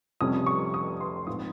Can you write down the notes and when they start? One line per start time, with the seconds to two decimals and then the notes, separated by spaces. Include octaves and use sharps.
0.21 F1 F2 C3 G3 C#4 D#6
0.46 C#6
0.74 D#6
1.01 C6
1.27 A#1 G#2 F3 C4 D#4 D#6